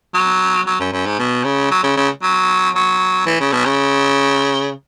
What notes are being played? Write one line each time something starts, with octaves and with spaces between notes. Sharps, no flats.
F#3
F#3
F#2
F#2
G#2
B2
C#3
F#3
C#3
C#3
F#3
F#3
E3
C#3
B2
C#3